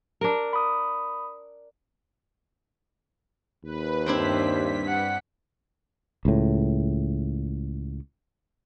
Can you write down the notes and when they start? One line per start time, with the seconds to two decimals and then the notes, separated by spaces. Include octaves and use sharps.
0.21 D4 A#4
0.53 B5 D#6
3.64 D#2 B4
4.06 G2 C4 D4 E4 C5 B6
4.88 F#5
6.25 C#2 A2